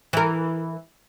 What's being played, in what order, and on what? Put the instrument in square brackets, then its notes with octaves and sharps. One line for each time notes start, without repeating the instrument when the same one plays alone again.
[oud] E3 A#4